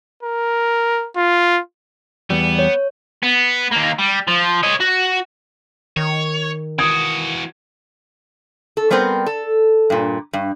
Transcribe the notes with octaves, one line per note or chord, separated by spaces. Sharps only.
A#4
F4
E2 G3 B3
C#5
B3
D#2 A#3
G3
F3
C#5 D#5
F#4
D#3 C#5
E3 F#4 D#6 G#6 D7
A4
G3 B3 C4 A#4 C5
A4
G2 A#2
G2